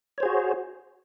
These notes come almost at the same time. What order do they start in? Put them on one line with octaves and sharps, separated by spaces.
C#5 C5 G#4 F#4